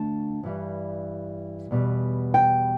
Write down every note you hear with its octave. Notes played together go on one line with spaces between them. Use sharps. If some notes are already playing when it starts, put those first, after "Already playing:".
Already playing: D2 D3 A3 A5
G2 E3 G3
E2 B2 G3
G5